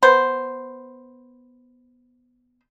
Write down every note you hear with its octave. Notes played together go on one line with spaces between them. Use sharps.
B3 C5